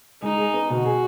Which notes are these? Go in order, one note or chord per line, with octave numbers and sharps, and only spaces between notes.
G#3 D#4
G#4
B3
B2 F#4
G#4